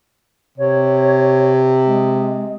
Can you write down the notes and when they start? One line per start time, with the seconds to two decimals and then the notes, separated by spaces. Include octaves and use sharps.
0.58 C3 C#5
1.85 G#3